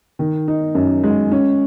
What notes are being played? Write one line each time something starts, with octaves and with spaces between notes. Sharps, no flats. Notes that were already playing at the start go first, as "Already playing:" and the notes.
D#3
D#4
F#2
G#3
C#4